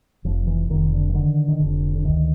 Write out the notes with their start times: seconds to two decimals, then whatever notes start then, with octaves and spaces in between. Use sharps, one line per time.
0.25 F1 F3
0.47 E3
0.69 F1 D#3
0.93 D3
1.09 E3
1.14 D3 D#3
1.48 D#3
1.59 F1 D3
1.95 D3
2.05 D2 D#3